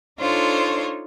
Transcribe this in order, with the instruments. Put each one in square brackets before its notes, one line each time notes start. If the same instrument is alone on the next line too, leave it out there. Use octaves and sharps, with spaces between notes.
[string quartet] D4 D#4 F4 A4 C5 C#5